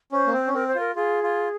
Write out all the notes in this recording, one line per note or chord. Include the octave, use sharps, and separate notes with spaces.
C#4 C5
A#3
C4
C#4
C4 A#4
C5
F4 A#4
F4 G#4
F4